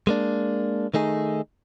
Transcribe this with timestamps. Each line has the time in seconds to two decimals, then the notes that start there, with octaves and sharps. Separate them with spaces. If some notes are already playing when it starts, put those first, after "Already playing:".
0.07 G#3 A#3 D4
0.94 D#3 A3 D#4 G#4